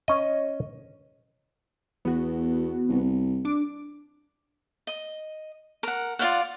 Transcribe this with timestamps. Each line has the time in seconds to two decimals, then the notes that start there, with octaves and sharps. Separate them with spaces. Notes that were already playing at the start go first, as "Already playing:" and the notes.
0.08 C#4 D#5
2.05 E2 B3 F#4
2.89 C2
3.45 D4 D6
4.87 D#5
5.83 A#4 F#5
6.19 F4 D5 F5 F#5